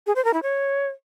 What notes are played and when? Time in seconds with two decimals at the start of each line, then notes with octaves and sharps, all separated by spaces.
0.07 G#4
0.16 C5
0.25 A#4
0.34 E4
0.43 C#5